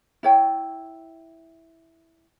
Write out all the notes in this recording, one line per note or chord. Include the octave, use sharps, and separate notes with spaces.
E4 C#5 G5